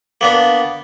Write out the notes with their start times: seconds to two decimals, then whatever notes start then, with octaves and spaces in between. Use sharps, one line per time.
0.21 A#3 B3 D4